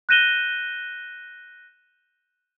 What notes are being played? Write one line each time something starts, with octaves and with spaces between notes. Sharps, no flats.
F#6 G6 A#6 D#7 E7 G7